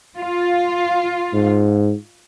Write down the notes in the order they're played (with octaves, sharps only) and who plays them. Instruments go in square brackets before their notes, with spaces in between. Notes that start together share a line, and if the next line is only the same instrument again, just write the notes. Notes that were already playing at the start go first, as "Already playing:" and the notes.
[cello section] F4
[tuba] G#2